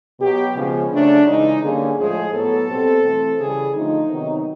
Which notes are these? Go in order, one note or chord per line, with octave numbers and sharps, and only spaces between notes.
B2 F#3 B3 G4
C#3 F3 G#3 B3 C#4
C#3 F#3 A3 C#4 D4
C#3 E3 G#3 D#4
D3 G3 A#3 C#4 G#4
A2 F3 G#3 G#4
A2 F#3 B3 A4
B2 G3 C4
E3 A3 C4
C#3 E3 G3 G#4
D3 F3 A3 D#4
C3 D#3 F#3 B3